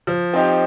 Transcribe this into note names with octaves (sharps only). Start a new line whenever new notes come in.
F3
C4 D#4 G4